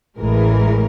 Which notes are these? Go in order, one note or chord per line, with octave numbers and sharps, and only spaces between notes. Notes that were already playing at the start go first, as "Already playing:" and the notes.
A1 A2 E3 G#3 A#4